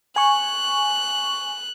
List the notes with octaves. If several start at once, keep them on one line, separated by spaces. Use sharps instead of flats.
G#5 C#6 F#6